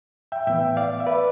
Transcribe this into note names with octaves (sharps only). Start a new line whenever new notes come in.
E5 G5
A2 E3 B3 E5 G5
D5 F5
E5
B4 D5